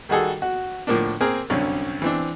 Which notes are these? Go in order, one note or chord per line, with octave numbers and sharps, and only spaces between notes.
D#3 G3 F#4 G#4 A4
F#4
A2 D3 F3 A#3 D4
A#3 C4 G#4 A#4
C2 F#2 D3 C#4
E3 C4 D4